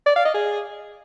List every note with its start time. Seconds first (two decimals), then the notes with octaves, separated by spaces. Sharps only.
0.06 D5
0.16 F5
0.25 D#5
0.34 G#4